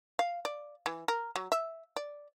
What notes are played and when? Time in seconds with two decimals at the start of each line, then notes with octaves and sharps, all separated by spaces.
0.19 F5
0.45 D5
0.86 E3
1.08 A#4
1.36 F#3
1.52 E5
1.96 D5